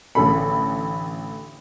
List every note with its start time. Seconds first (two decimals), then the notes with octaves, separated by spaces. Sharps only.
0.15 A1 D3 A4 B5